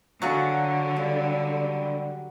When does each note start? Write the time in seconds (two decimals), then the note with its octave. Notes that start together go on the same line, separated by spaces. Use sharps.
0.22 D3 F#3 F4 F#4 G#4
0.96 G3 F4